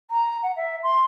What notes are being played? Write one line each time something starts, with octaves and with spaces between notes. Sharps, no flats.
A#5
F#5
E5
C6